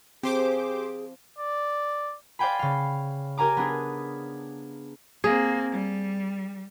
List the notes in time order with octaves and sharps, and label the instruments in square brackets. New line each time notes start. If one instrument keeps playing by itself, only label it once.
[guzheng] F3 [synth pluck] C4 [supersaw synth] G4 C5 D6 [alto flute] G#4
[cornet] D5
[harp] C5 D5 F5 G5 G#5 B5
C#3 F5
G4 A#4 G#5 A#5 D6
B3 D4 G#4
[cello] A#3 C4 [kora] G#4
[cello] G3